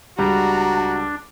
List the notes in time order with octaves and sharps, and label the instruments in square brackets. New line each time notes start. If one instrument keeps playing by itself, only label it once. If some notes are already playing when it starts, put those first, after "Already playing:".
[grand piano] C#2 G3 [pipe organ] D4 [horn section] F#4 [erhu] A#5